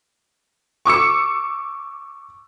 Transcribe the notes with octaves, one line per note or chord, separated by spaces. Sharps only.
C#6 D6 E6 C#7